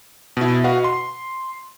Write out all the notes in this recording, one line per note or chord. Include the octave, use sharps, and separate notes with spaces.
B2 E4
F#4 B4 D#5 F5 F#5
C6